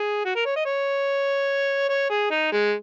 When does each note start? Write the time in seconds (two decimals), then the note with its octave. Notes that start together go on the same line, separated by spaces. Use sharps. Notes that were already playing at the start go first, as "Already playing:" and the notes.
Already playing: G#4
0.25 F#4
0.36 A#4
0.46 C#5
0.56 D#5
0.65 C#5
1.89 C#5
2.10 G#4
2.31 D#4
2.52 G#3